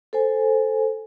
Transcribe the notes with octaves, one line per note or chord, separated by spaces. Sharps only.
A4 C5 G#5